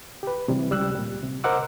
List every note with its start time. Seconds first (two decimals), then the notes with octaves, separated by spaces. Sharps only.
0.23 G4 B4
0.48 C3 E3 G3
0.71 C#2 G3 E6 F#6
0.95 A#2 G3
1.23 C3
1.44 A#4 C5 D#5 F#5 D6 E6